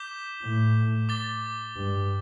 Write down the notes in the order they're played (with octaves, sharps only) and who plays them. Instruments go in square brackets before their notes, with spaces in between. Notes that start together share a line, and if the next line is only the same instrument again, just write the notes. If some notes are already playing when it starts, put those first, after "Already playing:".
Already playing: [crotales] D6 G6 B6 E7 G7
[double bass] A2
[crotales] D6 A6 G7
[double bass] G2